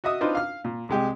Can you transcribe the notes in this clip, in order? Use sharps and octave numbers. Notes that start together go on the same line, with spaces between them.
F#4 D#5 E5 D#6
C4 D4 D#4 F4 B4 C5
F5 F6
A#2
C2 G#3 G4